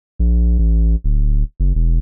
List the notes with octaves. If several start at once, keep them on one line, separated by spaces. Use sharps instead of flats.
A#1
A1
D1
F#1
E1